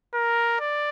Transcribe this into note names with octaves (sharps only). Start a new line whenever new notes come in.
A#4
D5